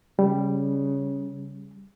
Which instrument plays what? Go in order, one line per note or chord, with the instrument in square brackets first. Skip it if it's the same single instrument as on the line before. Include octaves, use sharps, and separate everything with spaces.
[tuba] C#3 [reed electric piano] G3